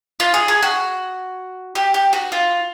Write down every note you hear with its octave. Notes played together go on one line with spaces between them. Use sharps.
F4
G#4
G#4
F#4
G4
G4
F#4
F4